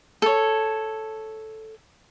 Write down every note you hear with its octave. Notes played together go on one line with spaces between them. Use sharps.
A4 C#5